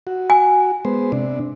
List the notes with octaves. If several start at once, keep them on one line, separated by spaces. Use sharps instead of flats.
F#4
G#5
G#3 B3 C5
C3 D4